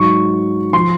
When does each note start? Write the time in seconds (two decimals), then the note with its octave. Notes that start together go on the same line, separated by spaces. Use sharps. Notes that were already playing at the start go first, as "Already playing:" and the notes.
Already playing: G#2 F#3 C#6
0.73 F3 C6